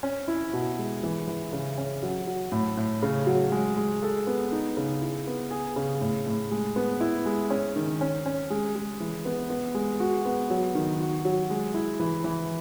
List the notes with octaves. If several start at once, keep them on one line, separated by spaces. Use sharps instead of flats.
C#4
E4
B2
G#3
E3
E3
C#3
C#4
F#3
F#3
A2
A2
C#3
F#3
G#3
G#3
A4
B3
D#4
C#3
E4
B3
G#4
C#3
A2
A2
G#3
B3
E4
G#3
C#4
D#3
C#4
C#4
G#3
G#3
E3
B3
B3
G#3
F#4
B3
F#3
D#3
F#4
F#3
G#3
E4
E3
E3